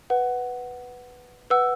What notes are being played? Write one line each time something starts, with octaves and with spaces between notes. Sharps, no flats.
B4 F#5
B4 F#5 E6